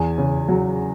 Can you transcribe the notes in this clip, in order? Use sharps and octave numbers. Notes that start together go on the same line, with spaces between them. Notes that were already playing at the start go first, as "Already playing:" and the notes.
Already playing: E2 G#5
C#3
F#3